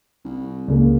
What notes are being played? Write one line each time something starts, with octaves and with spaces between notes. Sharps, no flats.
C2
C#2 A#3 G#4